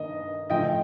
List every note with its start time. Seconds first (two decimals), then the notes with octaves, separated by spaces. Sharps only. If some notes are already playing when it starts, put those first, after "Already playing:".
Already playing: G2 D#3 A#3 D4 D#5
0.50 A2 F3 A3 D#5 G5